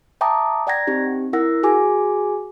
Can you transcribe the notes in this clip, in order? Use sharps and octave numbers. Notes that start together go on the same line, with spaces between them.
E5 G5 A5 A#5 D6 D#6
D5 F#5 G5 A#5 G#6 A#6
C4 D#4 G4
E4 A#4 F#5 E6 A#6
F#4 G#4 G#5 D6